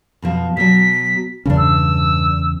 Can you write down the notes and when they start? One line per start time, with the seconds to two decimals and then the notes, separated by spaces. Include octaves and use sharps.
0.22 F2 B2 F3
0.57 B2 F#3 B6
1.46 E2 G2 C#3 C#4 D4
1.58 E6